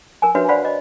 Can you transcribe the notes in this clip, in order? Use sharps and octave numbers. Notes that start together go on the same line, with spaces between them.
A#4 G#5
D4 F#4 B4 C#5 E5
C5 D5 F5 F#5 B5
D#5